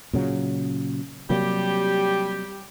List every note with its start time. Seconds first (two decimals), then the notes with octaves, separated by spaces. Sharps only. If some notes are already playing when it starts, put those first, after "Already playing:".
0.13 A#2 C#3 F#3
1.30 C3 F#3 G3 A#3 G4